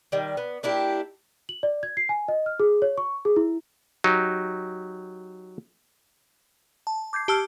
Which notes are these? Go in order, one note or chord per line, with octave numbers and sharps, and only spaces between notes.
D#3 G3
B3
A#3 D4 E4 G4
F#7
D5
G#6
C7
G#5
D#5
F6
G#4
C#5
C#6
G#4
E4
F#3 D#4 G4
A5
D6 G6 G#6 C7
G4 A5 E6 F6